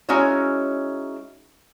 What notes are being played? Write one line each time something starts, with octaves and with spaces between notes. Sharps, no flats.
G#3 C#4 D#4 E4 F#4 C#5